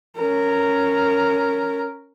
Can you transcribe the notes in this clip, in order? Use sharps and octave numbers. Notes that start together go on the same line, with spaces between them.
C#4 A#4